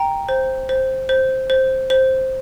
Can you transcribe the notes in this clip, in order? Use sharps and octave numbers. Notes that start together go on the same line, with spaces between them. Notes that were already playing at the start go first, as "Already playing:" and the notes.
Already playing: G5 A#5
C5
C5
C5
C5
C5